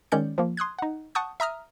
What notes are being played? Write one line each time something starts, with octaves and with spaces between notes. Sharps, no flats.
D#3 G#3 C#4 D5 G6 C#7
F3 A#3
C6 D#6 F#6 G#6
D#4 F#5
F#5 A5 C#6 D#6 G6
E5 A#5 D#6 F6